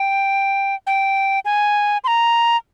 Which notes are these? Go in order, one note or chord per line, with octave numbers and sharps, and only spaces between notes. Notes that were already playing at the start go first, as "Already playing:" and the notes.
Already playing: G5
G5
G#5
C6
A#5